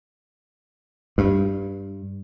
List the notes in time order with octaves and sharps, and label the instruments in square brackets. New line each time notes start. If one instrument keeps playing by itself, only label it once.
[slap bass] G2